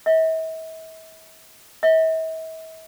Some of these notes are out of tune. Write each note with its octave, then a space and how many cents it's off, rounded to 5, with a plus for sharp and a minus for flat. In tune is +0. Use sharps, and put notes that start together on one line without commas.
E5 -45
E5 -45